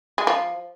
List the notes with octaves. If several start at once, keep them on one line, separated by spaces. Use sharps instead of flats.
G#3
F3